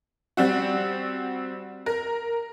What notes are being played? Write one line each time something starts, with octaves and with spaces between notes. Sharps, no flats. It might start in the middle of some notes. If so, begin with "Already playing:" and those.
G3 C4 F#4
A#4